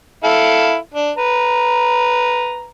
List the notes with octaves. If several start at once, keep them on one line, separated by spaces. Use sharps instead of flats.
E4 A4 F5
D4
B4 A#5